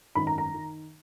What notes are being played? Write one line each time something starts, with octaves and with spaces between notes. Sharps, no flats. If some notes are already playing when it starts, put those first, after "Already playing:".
G#1 F#2 D#3 B5
A#5
A#5
D#3